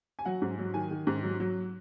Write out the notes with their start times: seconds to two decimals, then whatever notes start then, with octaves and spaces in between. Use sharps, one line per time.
0.19 G#5
0.25 F#3 F#5
0.42 G#2
0.59 F#3
0.74 D#3 G#5
0.91 D#3
1.07 G#2
1.23 F#3
1.40 F#3